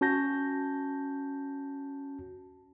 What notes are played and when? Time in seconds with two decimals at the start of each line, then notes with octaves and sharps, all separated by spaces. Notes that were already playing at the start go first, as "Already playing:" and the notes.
0.01 C#4 F#4 A5 G6 A#6